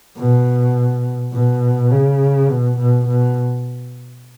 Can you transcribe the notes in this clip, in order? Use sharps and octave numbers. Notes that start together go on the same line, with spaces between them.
B2
B2
C#3
B2
B2
B2